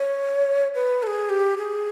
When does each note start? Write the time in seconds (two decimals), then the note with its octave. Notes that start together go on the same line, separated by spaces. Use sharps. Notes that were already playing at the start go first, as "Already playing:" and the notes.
Already playing: C#5
0.75 B4
1.03 A4
1.07 G#4
1.30 G4
1.58 G#4